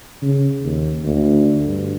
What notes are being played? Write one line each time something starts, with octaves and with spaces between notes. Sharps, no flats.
C#3
D#2
D2
G2